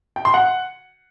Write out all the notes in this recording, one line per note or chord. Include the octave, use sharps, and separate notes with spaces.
G5
C6
F#5